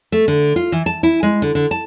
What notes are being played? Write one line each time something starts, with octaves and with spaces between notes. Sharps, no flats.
A3
D3
F4
E3
A5
E4
G#3
D3
D3
A5